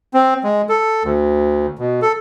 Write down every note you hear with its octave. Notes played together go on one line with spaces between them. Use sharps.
C4
G#3
A4
D2
B2
A4